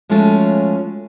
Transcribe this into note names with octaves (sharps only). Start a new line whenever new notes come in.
F3 G#3 A3 C#4 F4 F#4